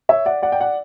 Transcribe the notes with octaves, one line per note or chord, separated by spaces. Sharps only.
C#5 E5
D5 F#5
D5 F#5
G5
D5 F#5